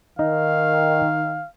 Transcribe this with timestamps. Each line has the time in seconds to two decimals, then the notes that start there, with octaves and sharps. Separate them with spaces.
0.19 D#3 D#4 D#5 F5